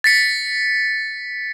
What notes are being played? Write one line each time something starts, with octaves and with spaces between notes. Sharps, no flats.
A6 B6 C#7